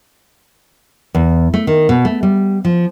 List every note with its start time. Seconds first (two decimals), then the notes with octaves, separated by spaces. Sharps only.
1.15 E2
1.54 A3
1.67 D#3
1.89 B2
2.05 A3
2.23 G3
2.65 F3